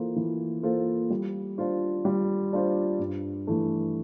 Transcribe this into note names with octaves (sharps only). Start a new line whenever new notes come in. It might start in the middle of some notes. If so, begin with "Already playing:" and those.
Already playing: E3 A#3 F4 A4 C5
E3
A#3 F4 A4 C5
G3
D4 F4 C5
G3
D4 F4 C5
G2
E3 A3